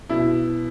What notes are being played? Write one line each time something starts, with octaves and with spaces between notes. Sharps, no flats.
B2 E4